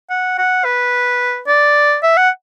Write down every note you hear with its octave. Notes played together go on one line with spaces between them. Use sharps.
F#5
F#5
B4
D5
E5
F#5